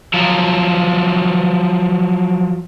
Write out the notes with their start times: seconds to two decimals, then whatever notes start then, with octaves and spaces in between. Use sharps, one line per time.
0.14 F3 F#3